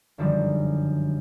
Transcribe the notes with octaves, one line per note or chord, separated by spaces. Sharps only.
G1 F#2 D3 D#3 F3 G3